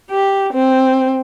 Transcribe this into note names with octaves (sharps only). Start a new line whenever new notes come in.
G4
C4